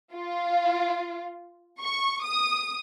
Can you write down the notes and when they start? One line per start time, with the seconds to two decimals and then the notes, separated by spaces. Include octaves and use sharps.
0.14 F4
1.80 C#6
2.23 D#6